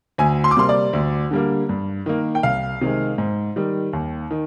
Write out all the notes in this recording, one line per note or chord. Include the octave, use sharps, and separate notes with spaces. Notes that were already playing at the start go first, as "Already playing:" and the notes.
D2 G#5
C6
D6
C3 G3 A#3 C6
D5
D2
D3 G3 A#3
G2
D#3 A#3
G5
C2 F5
C3 D#3 G#3
G#2
D#3 G3
D#2
D#3